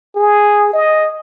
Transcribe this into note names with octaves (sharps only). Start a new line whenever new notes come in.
G#4
D#5